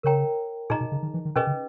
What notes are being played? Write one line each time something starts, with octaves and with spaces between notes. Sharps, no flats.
C#3 A#4 C#5 G5 A#5
A#2 D#4 G#4 D#5 A#5
B2
C#3
D#3
E3
D#3
B2 C#4 G#4 B4 D#5
C#3